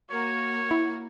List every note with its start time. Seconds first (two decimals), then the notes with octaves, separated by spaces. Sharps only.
0.11 A#3 F#4 C#5
0.71 E4